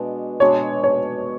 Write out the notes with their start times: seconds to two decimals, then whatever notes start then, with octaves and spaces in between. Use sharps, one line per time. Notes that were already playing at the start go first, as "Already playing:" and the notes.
Already playing: B2 G#3 D4
0.40 B2 G#3 D4 C#5
0.84 C#5